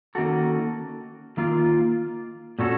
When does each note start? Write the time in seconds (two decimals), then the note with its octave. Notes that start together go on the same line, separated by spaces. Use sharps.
0.15 D#3 A#3 C#4 F#4 A4
1.37 D#3 A#3 F4
2.59 A#2 A3 C#4 F#4 A4